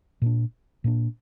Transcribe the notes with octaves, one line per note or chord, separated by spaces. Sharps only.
A#2 A#3 D4
A#2 A#3 D4